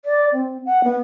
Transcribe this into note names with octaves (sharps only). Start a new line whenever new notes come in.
D5
C4
F#5
B3